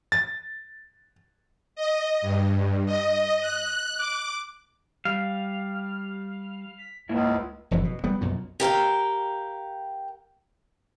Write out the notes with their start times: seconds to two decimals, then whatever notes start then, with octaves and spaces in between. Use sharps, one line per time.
0.12 A6
1.76 D#5
2.21 G2
2.86 D#5
3.41 F#6
3.98 D6
5.05 G3 F5
6.78 B6
7.09 C#2 G#2 A#3 E4
7.71 F1 A#1 F#2 E3
7.84 B2
8.04 G3 B3
8.21 B1 F#2 A#2
8.60 G4 A#4 F5 G5